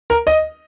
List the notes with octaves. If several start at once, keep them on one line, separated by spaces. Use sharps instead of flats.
A#4
D#5